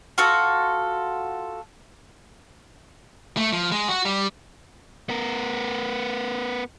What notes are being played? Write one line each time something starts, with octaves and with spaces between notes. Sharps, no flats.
F4 F#4 A4
A3
F3
G#3
F#4
G3
B3 A#4